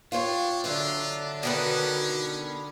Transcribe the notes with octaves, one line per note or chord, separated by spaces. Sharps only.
D4 F4 G4 C#5
D3 F#3 D4 F4 E5
B2 D#3 C#4 B4